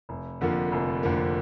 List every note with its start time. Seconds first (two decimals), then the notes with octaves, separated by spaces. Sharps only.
0.09 F1
0.41 F2 D3 F3 A#3
0.72 F1
1.03 F2 D3 F3 A#3